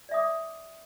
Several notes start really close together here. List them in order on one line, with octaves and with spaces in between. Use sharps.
D5 E5 D#6 D6